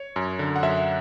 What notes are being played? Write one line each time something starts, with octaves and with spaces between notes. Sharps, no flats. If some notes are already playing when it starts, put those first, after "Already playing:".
Already playing: C#5
F#2
D3
F#5
F#2 E5